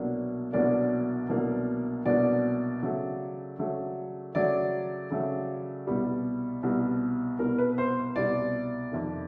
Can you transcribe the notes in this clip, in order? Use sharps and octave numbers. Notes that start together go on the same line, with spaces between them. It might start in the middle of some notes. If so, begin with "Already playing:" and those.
Already playing: C2 B2 F#3 A#3 D4
C2 B2 F#3 A#3 D4 D5
C2 B2 F#3 A#3 D4
C2 B2 F#3 A#3 D4 D5
C#3 F#3 A3
C#3 F#3 A3
C#3 F#3 A3 D5
C#3 F#3 A3
C2 B2 G3
C2 B2 G3
C2 B2 G3 A#4
B4
C5
C2 B2 G3 D5
F2 C3 D#3